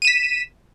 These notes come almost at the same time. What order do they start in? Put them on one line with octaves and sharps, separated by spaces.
D#7 E7 B6